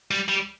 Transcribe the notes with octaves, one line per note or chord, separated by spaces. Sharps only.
G3
G3